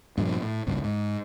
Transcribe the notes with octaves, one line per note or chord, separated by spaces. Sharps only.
G2 A#2 D#3 F3
A2
G#1 C#2 G2
G#2